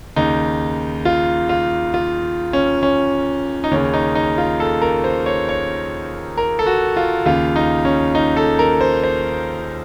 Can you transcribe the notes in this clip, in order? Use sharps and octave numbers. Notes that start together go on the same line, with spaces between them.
D#2 C#3 D#4
F4
F4
F4
C#4
C#4
D#4
D#2 C#3 C#4
D#4
D#4
F4
A4
A#4
C5
C#5
C#5
A#4
A4
F#4
F4
D#2 C#3 F4
D#4
C#4
D#4
A4
A#4
C5
C5